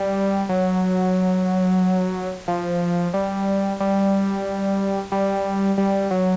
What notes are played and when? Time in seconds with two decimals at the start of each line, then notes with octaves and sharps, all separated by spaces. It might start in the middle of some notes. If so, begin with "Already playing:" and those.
Already playing: G3
0.49 F#3
2.48 F3
3.14 G3
3.80 G3
5.12 G3
5.78 G3
6.11 F#3